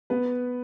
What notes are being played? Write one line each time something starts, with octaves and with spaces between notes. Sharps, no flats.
B3 B4